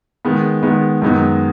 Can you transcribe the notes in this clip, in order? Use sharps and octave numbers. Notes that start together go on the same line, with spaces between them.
D#3 G#3 B3
D#3 G#3 B3
F#2 D#3 G#3 B3 D#4